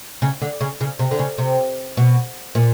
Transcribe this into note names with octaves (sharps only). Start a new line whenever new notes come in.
C#3
D3
C#3
C#3
C3
D3
C#3
C3
B2
A#2